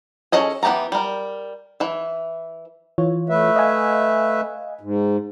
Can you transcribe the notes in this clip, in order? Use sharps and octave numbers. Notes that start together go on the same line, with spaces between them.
C#4 G#4 A4 D#5 G#5
E3 B3 G4 A5 A#5
G3 A#4
E3 E5
E3 F4 C#5
A3 B4 E5
D#5 F5 G#5
G#2